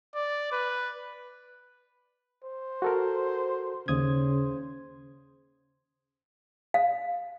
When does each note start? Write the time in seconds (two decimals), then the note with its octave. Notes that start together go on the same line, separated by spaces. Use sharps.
0.15 D5
0.52 B4
2.44 C5
2.82 F#4 A4 A#4
3.88 D#2 C#3 C5 D#6 G#6
6.74 F5